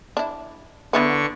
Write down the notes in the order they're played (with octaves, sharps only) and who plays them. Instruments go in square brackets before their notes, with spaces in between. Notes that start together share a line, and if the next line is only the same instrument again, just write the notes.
[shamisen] D4 E4
[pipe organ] D3 C#6 [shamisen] B3 E4 B4